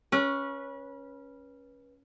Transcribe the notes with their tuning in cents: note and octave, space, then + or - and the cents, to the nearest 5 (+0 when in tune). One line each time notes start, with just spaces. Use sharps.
C#4 +0 B4 -30